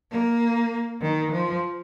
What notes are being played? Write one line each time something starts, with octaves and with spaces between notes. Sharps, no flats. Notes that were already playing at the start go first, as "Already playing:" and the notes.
A#3
D#3
F3